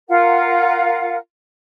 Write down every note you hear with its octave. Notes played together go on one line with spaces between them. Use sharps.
F4 A#4 F5 F#5